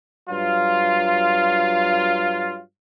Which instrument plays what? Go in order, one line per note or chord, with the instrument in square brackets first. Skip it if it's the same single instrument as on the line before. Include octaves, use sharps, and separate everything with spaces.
[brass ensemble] G2 F#3 F4